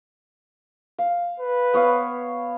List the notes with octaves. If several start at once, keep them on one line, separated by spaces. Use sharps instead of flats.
F5
B4
B3 C#5 F5